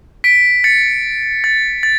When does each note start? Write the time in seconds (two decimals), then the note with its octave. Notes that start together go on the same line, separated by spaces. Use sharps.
0.24 B6 D7
0.64 A6 C#7
1.44 A6
1.83 A6